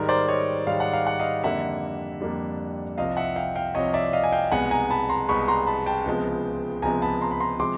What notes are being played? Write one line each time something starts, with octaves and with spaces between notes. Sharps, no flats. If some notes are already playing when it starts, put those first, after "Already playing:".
Already playing: G#2 D#3 G3 A#4
C5 D5
C#5 D#5
G#2 D#3 G3 F5
F#5
F5
F#5
D#5 F5
F2 D3 G3 A#3 D4 E5 F#5
F2 D3 G3 A#3 D4
C2 C3 F3 D#5 F5
E5 F#5
F5 G5
F5 G5
C2 C3 F3 C#5 D#5
D5 E5
D#5 F5
G#5
F5 G5
C2 B2 G#3 B3 F#5 G#5
G#5 A#5
A5 B5
A#5 C6
C2 B2 G#3 B3 B5 C#6
A#5 C6
A5 B5
G5 A5
C#2 C3 F3 G#3 B3
C#2 C3 F3 G#3 B3 G#5 A#5
A5 B5
A#5 C6
B5
A#5 C6
C3 F3 G#3 C6 D6